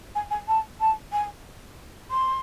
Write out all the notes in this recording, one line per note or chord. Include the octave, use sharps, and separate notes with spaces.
G#5
G#5
A5
A5
G#5
C6